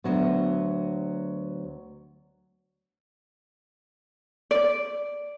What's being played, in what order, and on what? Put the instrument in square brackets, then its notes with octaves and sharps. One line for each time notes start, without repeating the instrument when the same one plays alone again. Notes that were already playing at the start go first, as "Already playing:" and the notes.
[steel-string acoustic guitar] D2 F#3 B3
[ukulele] D5